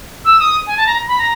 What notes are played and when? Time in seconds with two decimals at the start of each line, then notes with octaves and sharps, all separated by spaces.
0.25 E6
0.40 D#6
0.67 G#5
0.77 A5
0.87 A#5
1.08 B5
1.18 A#5